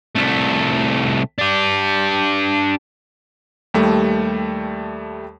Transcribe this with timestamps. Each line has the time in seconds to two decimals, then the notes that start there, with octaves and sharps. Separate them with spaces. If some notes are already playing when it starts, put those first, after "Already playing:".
0.15 C2 A3
1.38 D4 G4
3.74 D#2 G3 A3